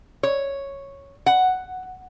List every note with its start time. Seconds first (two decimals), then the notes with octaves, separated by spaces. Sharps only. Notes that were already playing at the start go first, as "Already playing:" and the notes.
0.23 C#5
1.26 F#5